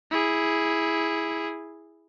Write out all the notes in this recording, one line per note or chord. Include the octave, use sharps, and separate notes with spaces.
E4 G#4